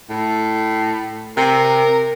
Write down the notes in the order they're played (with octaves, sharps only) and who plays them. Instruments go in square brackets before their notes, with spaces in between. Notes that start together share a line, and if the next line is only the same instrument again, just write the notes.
[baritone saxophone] A2
[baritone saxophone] C3 [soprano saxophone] A#4